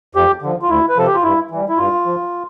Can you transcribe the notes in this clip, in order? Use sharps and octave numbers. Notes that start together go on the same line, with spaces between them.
F2 G4
D3 F3
F4
D2 E4
B4
C3 F3 A4
G4
F4
G2 E4
E3 G3
E4
G2 F4
F3